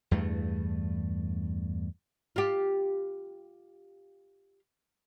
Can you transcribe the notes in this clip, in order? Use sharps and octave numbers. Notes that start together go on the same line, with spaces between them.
E2 G2 A3
F4 G4